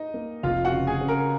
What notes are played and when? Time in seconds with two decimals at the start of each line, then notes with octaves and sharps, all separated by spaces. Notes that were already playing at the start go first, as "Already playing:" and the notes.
Already playing: D#4 D#5
0.14 A#3
0.43 F1 F4 F5
0.65 F#4 F#5
0.72 C#3
0.87 G#4 G#5
1.01 C#3
1.08 A#4 A#5